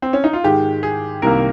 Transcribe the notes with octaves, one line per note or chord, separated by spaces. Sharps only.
C4
C#4
D#4
F4
G#2 D#3 G#3 G4
G#4
C2 C3 D#3 A#3 A#4